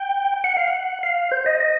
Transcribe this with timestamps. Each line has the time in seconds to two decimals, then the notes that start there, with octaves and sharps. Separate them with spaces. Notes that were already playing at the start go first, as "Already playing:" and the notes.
Already playing: G5
0.44 F#5
0.57 F5
0.68 F#5
1.03 F5
1.31 C5
1.46 D#5
1.60 D#5